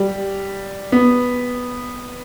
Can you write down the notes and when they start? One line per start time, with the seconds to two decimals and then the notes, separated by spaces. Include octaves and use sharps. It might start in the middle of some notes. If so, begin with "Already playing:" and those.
Already playing: G3
0.92 B3